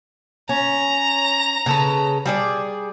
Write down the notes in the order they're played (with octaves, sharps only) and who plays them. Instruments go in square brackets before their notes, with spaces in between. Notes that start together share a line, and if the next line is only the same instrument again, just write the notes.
[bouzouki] C#4 [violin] A#5
[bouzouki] C#3 A4 B4
G3 G#4 D5